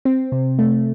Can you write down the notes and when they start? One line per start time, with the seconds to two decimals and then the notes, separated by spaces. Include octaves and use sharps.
0.05 C4
0.32 C3
0.59 A3